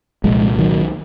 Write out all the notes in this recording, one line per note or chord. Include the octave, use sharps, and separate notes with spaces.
C2 A#2 F3 G#3
D#3 F#3